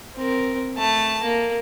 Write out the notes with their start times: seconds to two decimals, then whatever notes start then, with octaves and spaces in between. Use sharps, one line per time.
0.16 C4 A#4
0.78 A3 A5
1.23 A#3